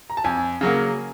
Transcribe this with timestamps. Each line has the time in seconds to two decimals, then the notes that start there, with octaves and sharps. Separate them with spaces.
0.10 A#5
0.17 A5
0.24 F2 G#5
0.61 C#3 F#3 A#3